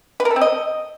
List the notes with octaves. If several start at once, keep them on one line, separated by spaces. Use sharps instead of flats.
B4
A#4
A4
C4
D#5